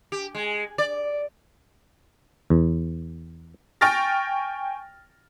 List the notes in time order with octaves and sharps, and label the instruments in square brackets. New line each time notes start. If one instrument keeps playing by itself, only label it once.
[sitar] G4
G#3
D5
[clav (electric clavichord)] E2
[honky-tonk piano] G5 G#5 C#6 F6 A6 A#6